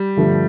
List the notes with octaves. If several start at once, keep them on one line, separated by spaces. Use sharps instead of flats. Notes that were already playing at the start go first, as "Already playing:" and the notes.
Already playing: G3
G2 D3 F3 A3